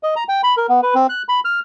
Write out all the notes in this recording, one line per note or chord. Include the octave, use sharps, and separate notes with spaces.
D#5
A#5
G5
B5
A#4
B3
B4
C4
F#6
B5
F6